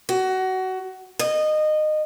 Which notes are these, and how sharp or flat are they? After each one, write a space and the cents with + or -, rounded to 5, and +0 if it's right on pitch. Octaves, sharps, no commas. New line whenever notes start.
F#4 +20
D#5 -20